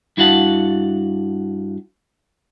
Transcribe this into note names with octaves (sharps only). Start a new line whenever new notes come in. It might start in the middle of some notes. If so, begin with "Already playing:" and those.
G2 E4 F#4 F5 F#5 A5